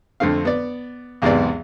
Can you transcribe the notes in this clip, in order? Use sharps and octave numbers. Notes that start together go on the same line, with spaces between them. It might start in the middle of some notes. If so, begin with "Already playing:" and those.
F2 D3 A3 C4 F5
B3 D5
B1 E2 G#2 C3 B3 D5